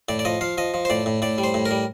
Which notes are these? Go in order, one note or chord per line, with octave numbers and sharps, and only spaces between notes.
A2 D5
D5
F3 D#5
F3 F5
F3 D#5
F3
C5
A2 D5
A2
A2 D5
G3
C5
A2
A#4
G3